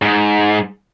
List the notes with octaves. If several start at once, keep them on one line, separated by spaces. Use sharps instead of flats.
G#2